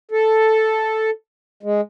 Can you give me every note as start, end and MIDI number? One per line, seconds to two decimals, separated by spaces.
0.11 1.10 69
1.63 1.81 56